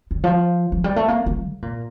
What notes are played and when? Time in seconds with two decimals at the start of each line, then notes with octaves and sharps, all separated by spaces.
0.11 D3
0.24 F3
0.72 F3
0.84 G3
0.96 A3
1.08 A#3
1.26 A3
1.44 C#3
1.62 A#2